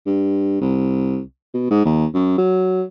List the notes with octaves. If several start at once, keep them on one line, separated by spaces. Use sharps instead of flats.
G2
C2
B2
G#2
D#2
F#2
F#3